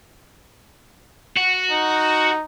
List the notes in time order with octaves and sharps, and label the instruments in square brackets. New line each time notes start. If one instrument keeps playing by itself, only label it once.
[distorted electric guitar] F#4
[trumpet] D#4